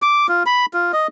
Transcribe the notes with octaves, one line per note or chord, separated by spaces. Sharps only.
D6
F4
B5
F4
D#5